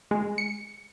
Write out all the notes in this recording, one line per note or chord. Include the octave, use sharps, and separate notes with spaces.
G#3
C#7